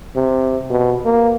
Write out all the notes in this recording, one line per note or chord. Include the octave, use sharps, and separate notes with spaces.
C3
B2
A#3